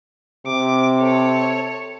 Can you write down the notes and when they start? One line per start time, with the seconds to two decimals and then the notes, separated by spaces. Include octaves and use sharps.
0.47 C3 D6
0.98 A4 C#5